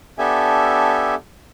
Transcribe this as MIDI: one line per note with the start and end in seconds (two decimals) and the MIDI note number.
0.18 1.15 59
0.18 1.15 62
0.18 1.15 67
0.18 1.15 69
0.18 1.15 76
0.18 1.15 80